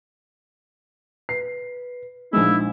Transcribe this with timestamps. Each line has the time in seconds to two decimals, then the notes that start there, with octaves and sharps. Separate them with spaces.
1.29 B4 C7
2.33 A#1 G#3 D#4 E4